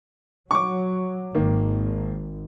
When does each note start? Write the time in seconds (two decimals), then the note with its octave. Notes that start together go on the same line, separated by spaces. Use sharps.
0.51 F#3 C#6 D6
1.35 G#1 D#3 A#3